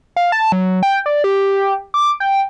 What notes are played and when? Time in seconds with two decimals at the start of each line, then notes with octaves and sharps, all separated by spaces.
0.16 F5
0.32 A5
0.52 F#3
0.83 G5
1.06 D5
1.24 G4
1.94 D6
2.20 G5